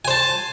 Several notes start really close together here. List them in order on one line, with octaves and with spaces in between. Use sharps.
G#5 C5 A5